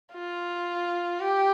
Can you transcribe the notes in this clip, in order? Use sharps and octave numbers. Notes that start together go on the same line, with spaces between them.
F4
G4